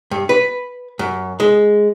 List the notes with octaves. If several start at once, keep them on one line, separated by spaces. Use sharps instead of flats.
G2
B4
F#2
G#3